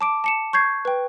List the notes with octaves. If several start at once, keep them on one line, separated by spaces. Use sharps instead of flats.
A5 D6 D7
A5 C#7 E7
C#6 G6 G#6 C7
B4 G5